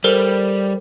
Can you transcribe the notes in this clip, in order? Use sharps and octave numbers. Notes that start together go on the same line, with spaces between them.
G3 A4 A#4 C5